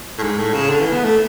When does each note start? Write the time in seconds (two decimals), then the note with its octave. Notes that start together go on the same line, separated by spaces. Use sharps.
0.18 A2
0.23 G#2
0.39 A2
0.54 C#3
0.70 D3
0.80 E3
0.92 B3
1.04 A3